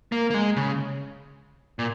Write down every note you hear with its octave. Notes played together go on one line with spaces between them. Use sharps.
A#3
A#3
G#3
C#3
A#2